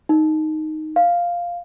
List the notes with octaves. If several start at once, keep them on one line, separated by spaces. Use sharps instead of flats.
D#4
F5